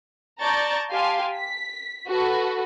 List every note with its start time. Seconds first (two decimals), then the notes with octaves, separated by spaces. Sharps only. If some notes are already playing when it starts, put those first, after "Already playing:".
0.41 D5 A5 A#5 C#6 G6 A6
0.92 G4 F5 G#5 A5 C6
1.36 B6
2.09 F#4 A4 B4